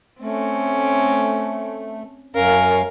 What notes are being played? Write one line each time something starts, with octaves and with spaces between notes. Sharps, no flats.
A3 C4 C#4
F#2 C#4 A#4 C#5 F5